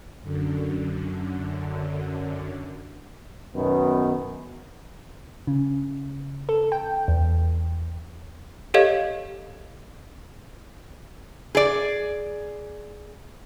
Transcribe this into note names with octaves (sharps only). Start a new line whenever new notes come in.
F#2 D3
F#2 B2 D#3 B3
C#3
A4
G5
E2
G4 A4 C#5 D#5 F5 G#6
G#4 D5